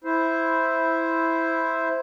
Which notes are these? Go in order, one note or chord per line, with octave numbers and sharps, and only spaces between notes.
E4 C5